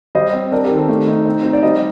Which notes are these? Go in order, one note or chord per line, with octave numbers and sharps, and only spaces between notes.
G3 C5 D#5
C4
D4 A#4 D5
G4 A#4
D#3
A4 C5
A3
D#4
C4
D#4 C5
D5
G3 C5 D#5